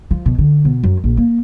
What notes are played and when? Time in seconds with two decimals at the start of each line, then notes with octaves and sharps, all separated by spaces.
0.11 F3
0.26 B2
0.38 D3
0.65 B2
0.83 F#2
1.04 A#1
1.17 A#3